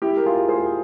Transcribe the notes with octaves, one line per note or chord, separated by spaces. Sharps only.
E4 G4
A#4
F4 G#4
G#4 C5